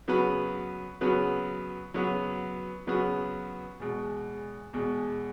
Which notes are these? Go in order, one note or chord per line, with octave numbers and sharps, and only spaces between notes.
C#3 F#3 B3 F#4 B4
C#3 F#3 B3 F#4 B4
C#3 F#3 B3 F#4 B4
C#3 F#3 B3 F#4 B4
E2 B2 G#3
E2 B2 G#3